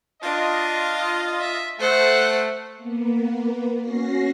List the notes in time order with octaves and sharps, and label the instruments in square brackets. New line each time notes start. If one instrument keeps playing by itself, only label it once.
[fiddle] D4 [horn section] F4 D#5
[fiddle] E5
[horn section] A3 [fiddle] C5 F#5
[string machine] A#3 B3
C#4 F#4 A#6 C7